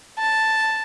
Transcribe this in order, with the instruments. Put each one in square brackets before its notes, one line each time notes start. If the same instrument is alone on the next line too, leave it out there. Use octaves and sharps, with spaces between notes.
[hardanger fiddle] A5